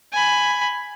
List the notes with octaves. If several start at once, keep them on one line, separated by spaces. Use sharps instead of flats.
G#5 B5